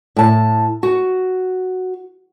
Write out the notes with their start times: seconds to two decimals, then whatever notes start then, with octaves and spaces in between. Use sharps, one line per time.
0.17 A2 A5
0.83 F#4